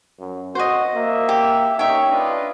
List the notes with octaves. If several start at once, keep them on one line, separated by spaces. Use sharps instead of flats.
F#2
F#4 C5 D#5
A#3 E5
G4
C#4 D#4 C#5 E5 G5
D4 F4 B4 D#5